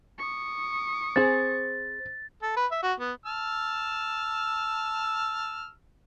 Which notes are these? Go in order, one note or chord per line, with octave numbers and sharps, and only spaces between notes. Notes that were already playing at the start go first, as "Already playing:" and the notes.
C#6 D#6
C4 G#4 C5 A6
A4
B4
E5
F#4
B3
A5 E6 F6